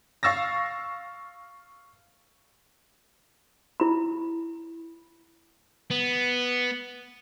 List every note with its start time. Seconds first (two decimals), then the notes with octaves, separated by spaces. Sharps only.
0.23 F5 C#6 E6 A6 A#6
3.80 E4 B5
5.91 B3